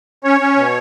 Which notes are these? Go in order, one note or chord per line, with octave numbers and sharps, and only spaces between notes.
C#4 C#5
C#4
B2